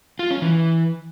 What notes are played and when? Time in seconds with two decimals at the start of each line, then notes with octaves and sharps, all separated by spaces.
0.19 F4
0.31 C#4
0.42 E3